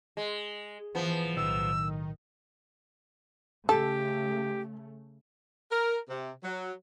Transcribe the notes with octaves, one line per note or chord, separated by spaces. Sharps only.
G#3
E3 F3 B3
B1 A2 D#3 E6
C#3 A3 G4 A4
A#4
C3
F#3